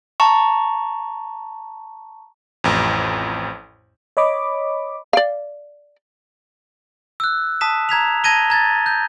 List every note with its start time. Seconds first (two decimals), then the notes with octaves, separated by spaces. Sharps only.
0.20 A5 A#5 C#6
2.64 A1 F2
4.17 C#5 D#5 B5 D6
5.13 D5 F5
7.20 E6 F#6
7.61 A5 D#6 B6 E7
7.89 A#5 G#6 B6 F7
8.24 A5 G#6 A#6 D#7 G7
8.50 A#5 G#6 A6
8.86 G6